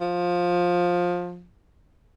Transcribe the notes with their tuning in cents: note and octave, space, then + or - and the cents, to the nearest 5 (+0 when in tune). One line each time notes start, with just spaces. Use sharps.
F3 +15